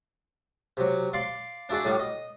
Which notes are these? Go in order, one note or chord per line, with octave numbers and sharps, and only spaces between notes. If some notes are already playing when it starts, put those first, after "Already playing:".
C3 F#3
D5 F5 C6
D4 E4 F#4 G#4 D5
A2 F#3 G3
D#5